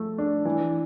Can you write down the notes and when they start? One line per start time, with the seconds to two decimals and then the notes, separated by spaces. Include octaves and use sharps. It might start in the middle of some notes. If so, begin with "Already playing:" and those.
Already playing: F3 A3
0.18 D4
0.45 E3